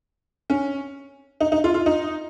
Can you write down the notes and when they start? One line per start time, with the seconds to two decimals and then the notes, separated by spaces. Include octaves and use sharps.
0.50 C#4
1.41 D#4
1.52 D#4
1.64 F4
1.74 F4
1.86 D#4